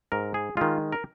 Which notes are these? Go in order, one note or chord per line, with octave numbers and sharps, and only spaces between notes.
G#2 A#4
G#4
D#3 G#3 F4
A#4